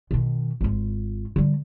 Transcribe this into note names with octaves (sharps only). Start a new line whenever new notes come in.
B2 D#3
G#1 F4
D3 G3